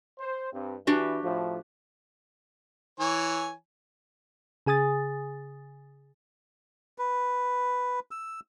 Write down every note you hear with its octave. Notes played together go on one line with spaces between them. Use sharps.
C5
G2 C4
E3 D4 F#4 G4
A2 F3
E3 C#5 G#5
C#3 G#4 G#5 D#6 A6
B4
E6